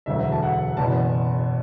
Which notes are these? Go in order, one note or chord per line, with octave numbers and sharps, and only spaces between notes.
E1 D2 D3 F#3 E5
A5
F#5
F#1 E2 B2 A5